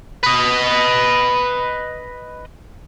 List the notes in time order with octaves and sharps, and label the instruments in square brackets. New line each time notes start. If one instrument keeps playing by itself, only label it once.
[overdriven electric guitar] B4 D#5